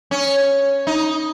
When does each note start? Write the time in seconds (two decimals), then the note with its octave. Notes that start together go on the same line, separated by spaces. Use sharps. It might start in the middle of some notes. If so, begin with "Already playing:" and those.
0.11 C#4
0.87 D#4